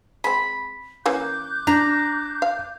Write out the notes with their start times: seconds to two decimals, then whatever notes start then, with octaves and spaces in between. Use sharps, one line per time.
0.24 G#3 C4 B5
1.06 E3 A#3 C#4 D6 F#6 G6
1.67 D4 A#5
2.42 F5